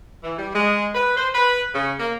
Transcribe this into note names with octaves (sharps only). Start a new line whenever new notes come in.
E3
G3
G#3
B4
C5
B4
C#3
A#3